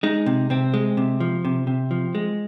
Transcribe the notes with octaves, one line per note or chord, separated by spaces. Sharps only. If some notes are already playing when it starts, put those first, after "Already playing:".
G#3 D#4
C3
C3 C4
G#3
C3
F3
C3
C3
F3
G#3